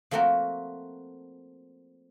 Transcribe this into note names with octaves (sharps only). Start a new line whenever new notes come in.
F3 A3 A#3 C4 F#4 A#4